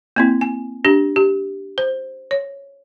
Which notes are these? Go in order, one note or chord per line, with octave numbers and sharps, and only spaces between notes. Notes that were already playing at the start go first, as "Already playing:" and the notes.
A#3 C4 E4
G#5
D4 G4
G4
C5
C#5